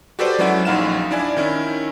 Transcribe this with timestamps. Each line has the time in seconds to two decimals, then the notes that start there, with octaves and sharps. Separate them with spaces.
0.19 F#4 G4 A4 B4 C5 D5
0.38 F#3 G#3 C#4 E4 F#4 F#5
0.65 A#1 F#2 D#4 F5 F#5 E7
1.11 D4 E4 D5 G#5
1.36 D#3 C#4 E4